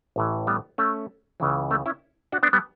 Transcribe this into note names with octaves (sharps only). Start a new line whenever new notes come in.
A1 A2 E3
G3 B3
A3 C#4
C#2 C#3 E3
A3 C#4
C#4 E4
D4 F#4
B3 D4
G3 B3